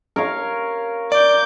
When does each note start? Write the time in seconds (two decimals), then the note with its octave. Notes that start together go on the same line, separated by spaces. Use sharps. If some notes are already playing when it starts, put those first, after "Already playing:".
0.16 A#4 C#5 F5
1.12 D5 D6 G6